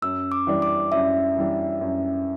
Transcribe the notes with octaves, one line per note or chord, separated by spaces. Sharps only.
F#2 E6
D6
E3 G3 D4
D6
F#2 E5
E3 G3 D4
F#2